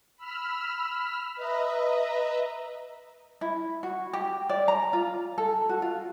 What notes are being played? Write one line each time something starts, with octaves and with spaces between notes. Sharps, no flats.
B5 E6 F6
B4 D#5 E5 A#5
E4
F#4
G4
D5
A#5
F4
A4
F#4
F4